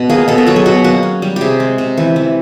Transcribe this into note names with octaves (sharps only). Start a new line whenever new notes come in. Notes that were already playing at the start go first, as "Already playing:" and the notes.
Already playing: B2
A#3 G#4
B2 A4
A#4
F#3 A4
G#4
B2 F#4
A#3 F#4
C#4
G3
C3 G4 G#4
G#3
C3
E3
E3